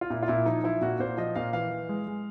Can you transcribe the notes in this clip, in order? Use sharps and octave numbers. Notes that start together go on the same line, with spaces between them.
F4
A#2 E4
F4
A#2 E4
F3 D#4
F3 E4
A#2 F#4
A#2 C5
F3 D#5
A#2 F5
E3 F5
E3
G#3
G#3